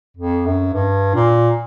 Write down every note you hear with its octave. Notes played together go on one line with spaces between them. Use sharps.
F2
F#2
G2
A#2